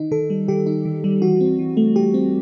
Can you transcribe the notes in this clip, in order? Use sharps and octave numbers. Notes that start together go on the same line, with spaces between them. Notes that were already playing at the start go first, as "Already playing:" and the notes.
Already playing: D#3 D#4
D#3 A4
G3
D#3 G4
D#4
D#3
G3
E3 F#4
C4
E3
A3
E3 G4
C4